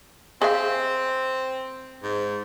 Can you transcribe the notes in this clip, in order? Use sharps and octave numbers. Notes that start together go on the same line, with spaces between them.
C4 G#4 E5 F5
G#2